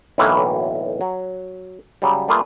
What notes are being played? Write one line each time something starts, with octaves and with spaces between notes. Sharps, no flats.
B1 A2 D3 E3 F#3 A#3
F#3
C#3 F#3 G3
G3 A3 A#3 F4 G#4 B4